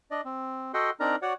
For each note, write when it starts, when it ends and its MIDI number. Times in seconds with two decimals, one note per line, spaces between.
0.11 0.21 62
0.11 0.21 74
0.11 0.21 75
0.25 0.72 60
0.74 0.90 66
0.74 0.90 69
0.74 0.90 75
0.74 0.90 78
0.74 0.90 79
0.74 0.90 84
1.00 1.16 60
1.00 1.16 62
1.00 1.16 63
1.00 1.16 70
1.00 1.16 74
1.00 1.16 82
1.22 1.33 66
1.22 1.33 73
1.22 1.33 74
1.22 1.33 78